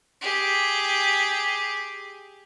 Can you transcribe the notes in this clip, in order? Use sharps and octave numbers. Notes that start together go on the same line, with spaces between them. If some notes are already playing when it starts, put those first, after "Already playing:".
G4 G#4